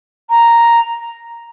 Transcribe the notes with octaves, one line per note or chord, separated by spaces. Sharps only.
A#5